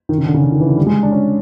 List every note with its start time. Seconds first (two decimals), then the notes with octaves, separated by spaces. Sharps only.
0.09 D#3
0.18 C#3
0.26 D3
0.34 C#3
0.44 D3
0.52 D#3
0.60 E3
0.69 D3
0.77 G3
0.86 G#3
1.03 D4
1.12 C#4